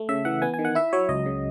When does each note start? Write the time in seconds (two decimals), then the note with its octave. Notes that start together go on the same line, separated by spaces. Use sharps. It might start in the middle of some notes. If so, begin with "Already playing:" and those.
Already playing: A3
0.09 C#3 E5
0.25 E3 F#5
0.42 B3 G#5
0.54 G#5
0.59 D#3
0.65 F#5
0.75 E4 E5
0.93 F#3 C#5
1.09 C#2 D#5
1.26 C#3